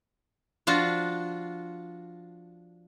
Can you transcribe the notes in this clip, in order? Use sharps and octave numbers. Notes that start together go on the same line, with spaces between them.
F3 D4 F4 F#4